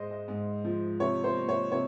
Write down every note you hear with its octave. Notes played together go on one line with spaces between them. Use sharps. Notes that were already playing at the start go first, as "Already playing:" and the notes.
Already playing: G#2 G#3 C5 D#5
D#5
G#2
F3
C3 C#5
C5
A#3
C#5
C3 C#5